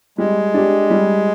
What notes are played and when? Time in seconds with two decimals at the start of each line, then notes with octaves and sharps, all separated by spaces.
0.18 G3 G#3
0.54 D4 G4
0.90 G3